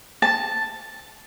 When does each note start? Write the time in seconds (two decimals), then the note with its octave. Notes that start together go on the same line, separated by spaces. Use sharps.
0.22 A5